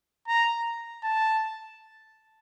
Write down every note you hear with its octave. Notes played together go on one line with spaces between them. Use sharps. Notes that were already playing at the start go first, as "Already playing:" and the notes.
A#5
A5